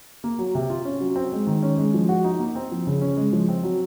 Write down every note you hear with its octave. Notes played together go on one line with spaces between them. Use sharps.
A#3
F#3
C3
F4
C#4
F#3
C4
G#3
D#3
C#4
G#3
F3
F#4
D#4
A#3
C4
F3
C#3
C#4
G#3
F3
C4
F#3